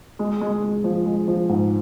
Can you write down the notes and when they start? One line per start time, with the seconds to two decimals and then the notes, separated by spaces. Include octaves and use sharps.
0.19 G#3
0.41 G#3
0.63 G#3
0.84 F3
1.06 G#3
1.28 F3
1.49 G#2